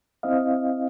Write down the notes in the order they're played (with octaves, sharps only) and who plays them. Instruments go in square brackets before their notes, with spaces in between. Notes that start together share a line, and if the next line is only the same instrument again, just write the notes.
[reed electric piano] C4 E4 D#5 F5